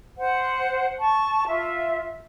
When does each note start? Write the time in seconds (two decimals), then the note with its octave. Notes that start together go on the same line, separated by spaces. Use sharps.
0.17 C5 F#5
0.99 A5 C#6
1.48 F4 E5